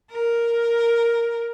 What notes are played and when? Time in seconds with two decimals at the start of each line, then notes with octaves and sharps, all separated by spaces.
0.11 A#4